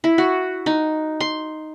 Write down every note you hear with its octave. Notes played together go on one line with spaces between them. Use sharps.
E4
F#4
D#4
C6